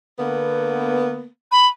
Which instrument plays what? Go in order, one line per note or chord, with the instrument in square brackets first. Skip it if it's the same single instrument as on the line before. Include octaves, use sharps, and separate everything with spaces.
[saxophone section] D3 A#3 B3
[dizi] B5